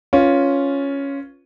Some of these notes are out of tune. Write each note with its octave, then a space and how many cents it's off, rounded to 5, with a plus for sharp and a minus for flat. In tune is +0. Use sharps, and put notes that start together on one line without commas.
C#4 +0 F4 +0 B4 +0